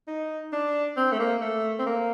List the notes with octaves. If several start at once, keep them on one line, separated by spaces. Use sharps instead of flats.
D#4
D4
C4
A3
A#3
A3
C4
A#3